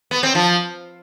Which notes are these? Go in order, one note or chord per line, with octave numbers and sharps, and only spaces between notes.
B3
C4
F3